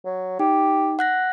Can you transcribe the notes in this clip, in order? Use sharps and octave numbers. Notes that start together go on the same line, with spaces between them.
F#3
D#4 G4
F#5 F#6 A#6